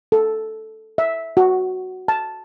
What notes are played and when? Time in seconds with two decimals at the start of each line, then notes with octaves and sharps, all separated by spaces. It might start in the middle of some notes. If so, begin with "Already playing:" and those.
0.12 A4
0.98 E5
1.37 F#4
2.08 A5